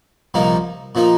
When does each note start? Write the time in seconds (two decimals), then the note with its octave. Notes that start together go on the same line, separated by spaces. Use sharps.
0.34 C2 A#2 F3 A#3 D#4
0.95 A#2 F3 A#3 D#4